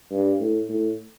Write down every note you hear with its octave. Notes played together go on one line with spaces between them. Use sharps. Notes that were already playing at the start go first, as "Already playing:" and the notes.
G2
A2
A2